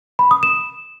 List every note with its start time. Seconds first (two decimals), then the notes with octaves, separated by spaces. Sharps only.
0.19 B5
0.31 D#6
0.43 E7